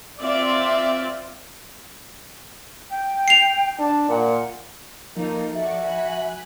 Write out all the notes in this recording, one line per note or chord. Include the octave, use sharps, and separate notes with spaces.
C4 F4 D5 E5
G5
C7 F7
D4 A5
A#2 F#5
F3 A#3 D#4 F4 A4
F#4 A4 D5 E5 C#6
G#5 B5 F#6